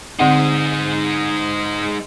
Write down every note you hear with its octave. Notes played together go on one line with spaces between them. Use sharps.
D3 G#3 C4 D#4 F#5